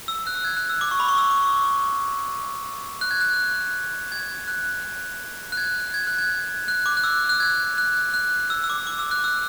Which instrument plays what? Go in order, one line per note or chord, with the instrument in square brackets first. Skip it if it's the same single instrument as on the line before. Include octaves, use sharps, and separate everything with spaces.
[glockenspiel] E6
F#6
G#6
F#6
E6
D6
C#6
B5
C#6
E6
D6
C#6
F#6
G#6
F#6
G#6
F#6
F#6
G#6
G#6
F#6
G#6
F#6
D6
F#6
E6
F#6
G#6
F#6
F#6
E6
E6
D6
D6
E6
F#6
E6